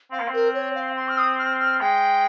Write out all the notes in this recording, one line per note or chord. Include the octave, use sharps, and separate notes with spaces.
C4 F5
A#3
C4
A#4
C#5
F5
C6
F6
D#6
F6
F6
G#3 G5